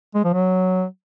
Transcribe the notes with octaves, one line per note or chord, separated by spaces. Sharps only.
G#3
F3
F#3